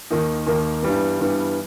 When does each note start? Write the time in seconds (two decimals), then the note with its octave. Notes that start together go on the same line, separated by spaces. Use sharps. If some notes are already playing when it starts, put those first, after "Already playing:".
0.10 D#2 D#3 A#3 D#4
0.47 D#2 D#3 A#3 D#4
0.82 G2 E3 G3 B3
1.19 G2 E3 G3 B3